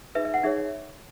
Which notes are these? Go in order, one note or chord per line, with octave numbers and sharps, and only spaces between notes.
D#4 G#4 B4 E5
E5
F#5
D#4 G#4 C#5 E5